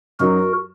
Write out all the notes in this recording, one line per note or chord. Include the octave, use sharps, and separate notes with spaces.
F#2 F#3 D#4 F#4 A#4